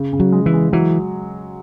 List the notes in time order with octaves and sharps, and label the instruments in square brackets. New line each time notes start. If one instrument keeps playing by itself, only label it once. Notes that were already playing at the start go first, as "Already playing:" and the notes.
Already playing: [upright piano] C#3
C#3
[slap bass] F#3
[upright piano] G#3
[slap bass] E3
[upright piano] G#3
[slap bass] E3 [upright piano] F#3